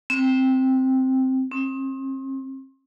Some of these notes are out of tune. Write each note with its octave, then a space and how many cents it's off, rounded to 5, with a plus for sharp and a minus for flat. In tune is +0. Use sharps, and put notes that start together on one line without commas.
C4 +0
C4 +40